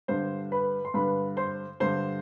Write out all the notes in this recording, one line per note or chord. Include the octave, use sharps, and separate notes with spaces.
G2 D3 C5 C6
B4 B5
C6
G2 D3 B4 B5
C5 C6
G2 D3 C5 C6